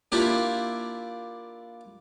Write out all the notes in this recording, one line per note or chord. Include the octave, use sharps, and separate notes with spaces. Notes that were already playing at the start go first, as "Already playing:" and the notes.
A#3 D4 E4 F4 G4 E5